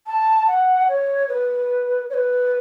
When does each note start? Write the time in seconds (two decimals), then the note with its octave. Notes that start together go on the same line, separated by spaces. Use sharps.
0.07 A5
0.48 F#5
0.89 C#5
1.29 B4
2.10 C#5
2.14 B4